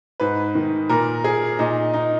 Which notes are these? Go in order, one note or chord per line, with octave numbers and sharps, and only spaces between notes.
G#2 B4
D#3
A#2 A#4
G#4
A#2 D#4
D#4